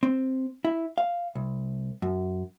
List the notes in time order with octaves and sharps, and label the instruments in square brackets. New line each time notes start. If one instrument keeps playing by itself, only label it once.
[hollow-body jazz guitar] C4
E4
F5
C2
F#2